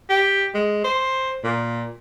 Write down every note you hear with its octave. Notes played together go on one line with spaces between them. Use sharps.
G4
G#3
C5
A#2